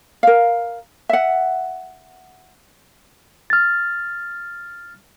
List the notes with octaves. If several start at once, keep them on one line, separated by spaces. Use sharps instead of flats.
A#4 F5
E5 F#5
F6 A6